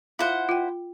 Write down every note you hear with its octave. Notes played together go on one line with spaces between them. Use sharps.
E4 F4 C5 F5 F#5
F4 G5